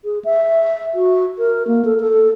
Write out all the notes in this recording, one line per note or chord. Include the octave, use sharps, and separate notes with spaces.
G#4
E5
F#4
A#4
A#3
A4
A4